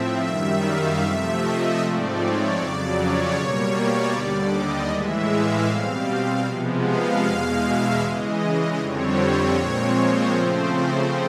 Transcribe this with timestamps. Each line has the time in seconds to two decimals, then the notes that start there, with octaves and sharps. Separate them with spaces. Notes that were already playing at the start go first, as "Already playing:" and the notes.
Already playing: A2 F3 C4 E5
0.23 F#2 D#3 G3 E5
0.63 F5
1.01 C3 F3 A3 E5
1.40 D#5
1.79 G#2 F3 A3 C4 D5
2.17 C#5
2.56 F2 C#3 F#3 D5
2.95 C#5
3.34 B2 G3 A#3
3.73 D5
4.11 D#2 D3 G3
4.51 D#5
4.89 A2 E3 G#3 E5
5.28 F5
5.67 B2 G3 C4
6.45 C3 F3 G#3 B3
6.83 F5
7.22 E2 B2 G#3
7.60 E5
8.00 C#3 E3 G#3 D#5
8.77 F2 D3 G3 C4 C#5
9.55 A#2 F3 G#3 C4
9.93 C5
10.33 C#3 F3 A3 C4